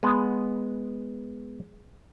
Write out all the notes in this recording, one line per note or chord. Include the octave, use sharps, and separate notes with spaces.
G#3 B3